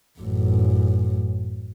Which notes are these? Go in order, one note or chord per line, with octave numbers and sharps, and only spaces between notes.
A1 F#2